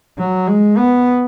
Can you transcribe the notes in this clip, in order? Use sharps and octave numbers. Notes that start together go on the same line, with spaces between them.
F#3
G#3
B3